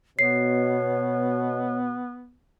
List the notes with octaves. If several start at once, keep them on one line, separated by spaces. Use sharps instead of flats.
B2 B3 C#5 C7